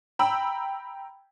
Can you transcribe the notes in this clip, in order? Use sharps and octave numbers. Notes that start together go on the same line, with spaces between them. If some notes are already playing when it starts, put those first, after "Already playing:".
G5 A#5 B5 E6